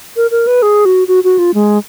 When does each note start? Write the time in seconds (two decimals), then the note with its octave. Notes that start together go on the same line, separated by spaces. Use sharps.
0.16 A#4
0.31 A#4
0.47 B4
0.62 G#4
0.85 F#4
1.08 F#4
1.24 F#4
1.39 F4
1.54 G#3